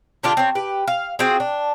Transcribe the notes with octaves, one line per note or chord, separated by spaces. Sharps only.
D3 D4 F4 G4
C4 C#5
G4 B4
F5
C4 F4 F#4 G#4
D4